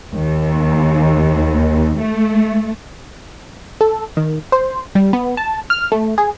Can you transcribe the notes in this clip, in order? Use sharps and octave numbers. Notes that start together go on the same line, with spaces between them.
D#2
A3
A4
D#3
C5
G3
B3
A5
F6
A3
G#4